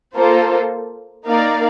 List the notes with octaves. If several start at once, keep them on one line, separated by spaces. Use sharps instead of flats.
A#3 F4 A4 C5
A#3 D#4 A#4 D5 F5